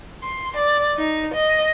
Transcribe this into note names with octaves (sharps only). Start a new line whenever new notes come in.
C6
D5
D#4
D#5